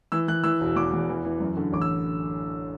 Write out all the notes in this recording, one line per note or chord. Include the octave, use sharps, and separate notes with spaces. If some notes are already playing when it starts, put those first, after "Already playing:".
E3 E6
E3 F#6
E3 E6
E1
E2 D6
E2
E3
E3
F#2
D3
A1 D6
E6